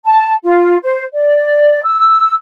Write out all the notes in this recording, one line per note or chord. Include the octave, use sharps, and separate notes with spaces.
A5
F4
C5
D5
E6